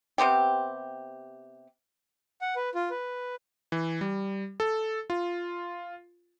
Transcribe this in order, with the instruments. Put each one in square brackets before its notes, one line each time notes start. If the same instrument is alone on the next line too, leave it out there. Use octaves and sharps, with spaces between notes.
[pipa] C3 B3 C4 G4
[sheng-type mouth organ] F#5
B4
F4
B4
[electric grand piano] E3
G3
A4
F4